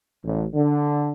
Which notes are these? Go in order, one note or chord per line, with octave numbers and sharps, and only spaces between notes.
A1
D3